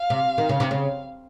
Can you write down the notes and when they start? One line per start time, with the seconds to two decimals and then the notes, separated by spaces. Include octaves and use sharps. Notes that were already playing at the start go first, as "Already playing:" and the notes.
Already playing: F5
0.10 C3
0.38 D#3
0.49 C#3
0.60 C3
0.71 C#3